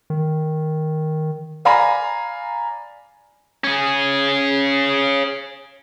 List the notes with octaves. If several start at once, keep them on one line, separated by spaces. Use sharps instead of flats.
D#3
D5 F5 G#5 A#5 B5 A#6
C#4 G#4